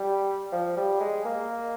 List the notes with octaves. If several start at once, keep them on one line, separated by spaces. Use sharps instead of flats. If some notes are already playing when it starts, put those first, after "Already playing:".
Already playing: G3
F3
G3
G#3
A#3